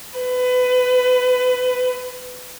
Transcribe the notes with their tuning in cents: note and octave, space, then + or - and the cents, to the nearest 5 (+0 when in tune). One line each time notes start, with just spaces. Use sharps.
B4 +25